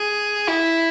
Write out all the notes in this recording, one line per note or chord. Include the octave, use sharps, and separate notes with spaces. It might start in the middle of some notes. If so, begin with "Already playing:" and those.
Already playing: G#4
E4